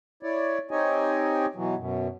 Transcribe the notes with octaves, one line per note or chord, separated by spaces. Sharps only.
E4 C#5 D5
C4 D#4 G4 C#5 D#5 G#5
B2 E3 F#3
F#2 B2